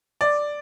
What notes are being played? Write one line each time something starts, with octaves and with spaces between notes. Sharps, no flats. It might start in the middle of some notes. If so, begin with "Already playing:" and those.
D5